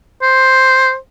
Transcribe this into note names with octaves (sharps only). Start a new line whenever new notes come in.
C5